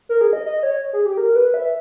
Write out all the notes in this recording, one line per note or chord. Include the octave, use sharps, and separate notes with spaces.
A#4
G#4
D#5
D#5
C#5
G#4
G4
A#4
B4
E5